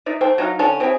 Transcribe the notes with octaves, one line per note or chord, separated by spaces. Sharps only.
D#4 D5 E5
A3 C5 G5
F#3 D#4 F5
D3 C#4 A5
C4 E4 G4 G#4